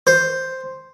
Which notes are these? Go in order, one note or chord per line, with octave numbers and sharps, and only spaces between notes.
C5